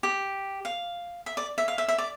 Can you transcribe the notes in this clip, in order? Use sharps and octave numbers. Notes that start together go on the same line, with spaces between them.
G4
F5
E5
D5
E5
F5
E5
E5
D5